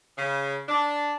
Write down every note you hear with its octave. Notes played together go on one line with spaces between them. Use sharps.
C#3
D4